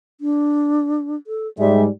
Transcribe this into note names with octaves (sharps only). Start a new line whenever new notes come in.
D4
A4
G#2 G3 G#3 E5